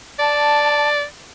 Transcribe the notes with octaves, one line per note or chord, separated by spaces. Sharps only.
D5 A5